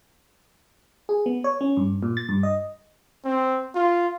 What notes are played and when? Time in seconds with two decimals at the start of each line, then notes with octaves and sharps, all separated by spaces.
1.09 G#4
1.26 B3
1.44 C#5
1.61 C#4
1.77 G2
2.03 A#2
2.17 A6
2.29 G2
2.43 D#5
3.25 C4
3.75 F4